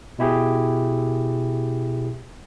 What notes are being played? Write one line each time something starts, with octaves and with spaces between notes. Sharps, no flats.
B2 E4 G4 G#4